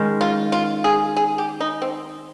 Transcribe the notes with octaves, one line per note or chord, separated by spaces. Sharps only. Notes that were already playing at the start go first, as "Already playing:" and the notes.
Already playing: D#3 G#3 C#4
F4
F4
G#4
G#4
G4
D#4
C4